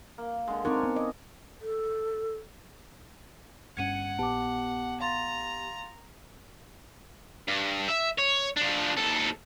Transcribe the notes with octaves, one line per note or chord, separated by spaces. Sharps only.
A#3
D3 G#3
C4 D4 D#4 A#4 C#5 G#5
B3
D5 D#5
A4
G1 G2 C#4 F#5 G#6 C#7 D#7
A#1 B3 G4 A5 D6
F5 A#5 C6 A6
G2
E5
C#5
F3 D4
D#2 A4